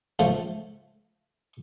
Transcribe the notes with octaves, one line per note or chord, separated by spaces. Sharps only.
C#2 F3 A3